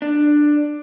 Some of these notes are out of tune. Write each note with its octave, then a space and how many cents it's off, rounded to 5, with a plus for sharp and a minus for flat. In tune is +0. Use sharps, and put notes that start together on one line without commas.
D4 +10